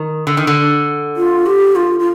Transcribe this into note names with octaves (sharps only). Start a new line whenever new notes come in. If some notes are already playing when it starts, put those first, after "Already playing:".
Already playing: D#3
D3
D#3
D3
F4
G4
F4
F4